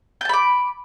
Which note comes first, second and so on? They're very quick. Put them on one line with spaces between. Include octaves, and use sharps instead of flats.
G6 A5 B5 D6